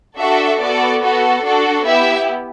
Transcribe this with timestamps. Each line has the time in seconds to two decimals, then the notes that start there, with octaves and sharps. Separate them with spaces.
0.18 D4 F#4 A4 E5
0.60 B3 F#4 A4 D5
1.02 B3 F#4 A4
1.44 D4 F#4 A4
1.85 B3 E4 G4 E5